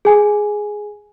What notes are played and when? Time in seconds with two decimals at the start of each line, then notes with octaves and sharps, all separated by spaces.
0.05 G#4 G#5